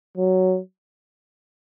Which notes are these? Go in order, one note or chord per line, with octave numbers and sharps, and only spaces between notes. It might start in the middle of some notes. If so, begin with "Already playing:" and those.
F#3